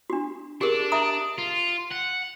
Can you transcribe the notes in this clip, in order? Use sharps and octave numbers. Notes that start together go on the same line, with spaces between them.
D4 F#4
D4 G4 G#4 A#4
E5 A#5 D#6
F4
F#5